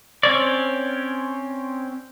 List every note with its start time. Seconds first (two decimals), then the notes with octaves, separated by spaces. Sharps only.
0.23 C4 C#4 C#5 D5